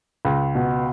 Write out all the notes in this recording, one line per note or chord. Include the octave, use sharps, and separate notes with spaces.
C#2
B2